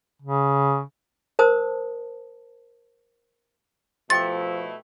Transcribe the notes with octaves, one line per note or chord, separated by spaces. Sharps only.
C#3
A#4 C5 A5 D#6
B2 F3 A3 E4 G4 G5 D6 A6